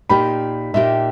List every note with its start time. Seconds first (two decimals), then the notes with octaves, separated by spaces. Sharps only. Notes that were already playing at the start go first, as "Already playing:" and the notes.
0.09 A#2 A#3 D#4 G4 B5
0.74 A#2 A#3 D#4 G4 E5